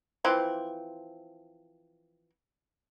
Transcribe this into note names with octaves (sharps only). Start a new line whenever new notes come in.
E3 F3 C4